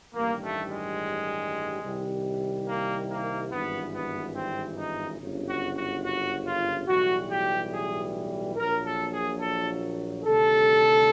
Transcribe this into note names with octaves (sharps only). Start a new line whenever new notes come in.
A1 G2 D#3 G3 A#3
A3
G#3
C2 C3 D#3 G3
A#3
A#3
G#1 G2 E3 B3
B3
C4
D#4
G1 F#2 C#3
F#4
F#4
F#4
F4
B1 A2 E3 G3 F#4
G4
G#4
A#1 A#2 F#3 A#4
A4
G#4
A4
D2 C3 D#3 G3 A4